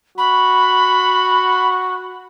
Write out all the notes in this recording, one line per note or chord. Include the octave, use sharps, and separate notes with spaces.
F#4 B5